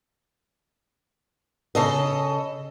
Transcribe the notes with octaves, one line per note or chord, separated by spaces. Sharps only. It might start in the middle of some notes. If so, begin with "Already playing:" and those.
C#3 A4 D#5